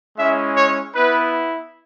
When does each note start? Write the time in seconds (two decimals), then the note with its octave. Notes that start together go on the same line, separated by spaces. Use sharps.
0.18 G#3 C#4 E4 E5
0.56 C#5
0.94 B3 E4 B4